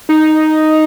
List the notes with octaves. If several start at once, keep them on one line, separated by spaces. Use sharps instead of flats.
D#4